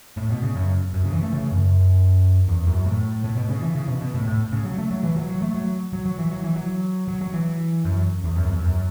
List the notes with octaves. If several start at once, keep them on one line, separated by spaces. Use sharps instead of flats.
A2
B2
C#3
F#2
F#2
C#3
E3
A3
C#3
F#2
E2
F#2
A2
A2
B2
C#3
E3
C#3
B2
B2
A2
A2
C#3
F#3
A3
F#3
E3
F#3
F#3
A3
F#3
F#3
F#3
E3
F#3
E3
F#3
F#3
F#3
E3
F#2
E2
F#2
E2
F#2